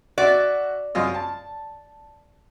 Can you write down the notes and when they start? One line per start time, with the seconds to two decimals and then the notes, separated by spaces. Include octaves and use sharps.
0.18 F#4 D5 E5
0.95 F#2 F4 D#5
1.14 A5